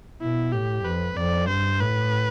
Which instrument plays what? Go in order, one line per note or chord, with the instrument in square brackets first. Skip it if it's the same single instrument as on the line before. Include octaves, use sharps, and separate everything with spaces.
[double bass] B2 [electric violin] E4
[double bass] A2 [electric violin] G4
[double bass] F2 [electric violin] B4
[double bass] F2 [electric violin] D5
[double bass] G2 [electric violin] C5
[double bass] A2 [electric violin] B4